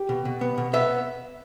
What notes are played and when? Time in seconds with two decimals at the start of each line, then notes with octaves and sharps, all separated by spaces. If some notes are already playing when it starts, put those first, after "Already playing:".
Already playing: G4
0.09 B2
0.25 B2
0.41 B3
0.58 B2
0.73 B3 E5